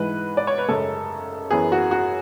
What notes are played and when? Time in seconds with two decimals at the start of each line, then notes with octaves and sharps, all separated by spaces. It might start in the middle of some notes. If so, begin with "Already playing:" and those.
Already playing: G#2 E3 G#3 B4
0.37 D5
0.47 C#5
0.58 B4
0.68 F#2 C#3 G#3 C#4 A4
1.51 F#2 E3 B3 G#4
1.72 F#4
1.91 F#4